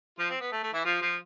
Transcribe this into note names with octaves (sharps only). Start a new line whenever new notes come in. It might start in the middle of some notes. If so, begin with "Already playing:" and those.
F3 F4
C4
B3
A3
A3
E3 E4
F3 F4
F3 F4